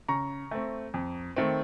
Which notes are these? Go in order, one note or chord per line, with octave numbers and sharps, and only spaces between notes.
C#3 A#5 C#6
A3 C4
F2
D#3 A3 C4